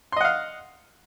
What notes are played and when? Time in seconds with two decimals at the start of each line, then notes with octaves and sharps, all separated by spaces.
0.12 C6
0.16 D#5
0.21 F#5
0.25 F5